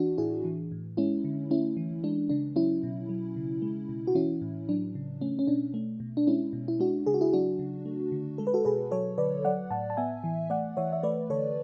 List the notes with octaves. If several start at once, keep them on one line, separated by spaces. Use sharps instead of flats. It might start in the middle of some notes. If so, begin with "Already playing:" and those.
Already playing: E3 D4 F#4
A2 E4 G#4
E3
A2
G#3 C#4 E4
D3
A3 C#4 E4
E3
G#3 D4
C#3 D4
F#3 C#4 E4
B2
F#3
C#3
G#3
B2
F#4
E3 C#4 E4
A2
F#3 D4
C#3
A3 C#4
C#4
B2 D4
A3
B2
D4
G#3 C#4 E4
B2
E4
G#3 D4 F#4
C#3 G#4
F#4
E4 G#4
F#3 D4 F#4
C#3
A3
D3
G#3 A4
B4
F#4 A4
B2 G#4 B4
F#3 A4 C#5
D3 B4 D5
F#3 D5 F#5
A2 F#5 A5
A5
B3 E5 G#5
E3
A3 D5 F#5
E3 C#5 E5
E5
A3 B4 D5
D3 A4 C#5